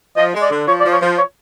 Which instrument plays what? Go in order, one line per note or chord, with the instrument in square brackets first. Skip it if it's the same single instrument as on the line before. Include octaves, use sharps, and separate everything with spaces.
[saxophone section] F3 [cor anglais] D#5
[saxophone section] G#3
[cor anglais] D5
[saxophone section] D3
[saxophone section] F3 [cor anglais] C#5
[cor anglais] D5
[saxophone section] F3
[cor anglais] C#5
[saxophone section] F3 [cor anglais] C5
[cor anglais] C#5